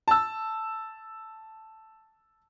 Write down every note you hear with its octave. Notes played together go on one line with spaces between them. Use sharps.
A5 E6